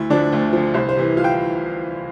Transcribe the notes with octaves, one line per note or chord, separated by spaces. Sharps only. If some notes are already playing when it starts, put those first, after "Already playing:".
Already playing: D2 E4 E5
D3 F3 D4 D5
D2
D3 F3
C2 C5
C5
C3 E3
F4 F5
G5